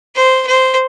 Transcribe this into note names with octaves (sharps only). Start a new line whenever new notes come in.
C5
C5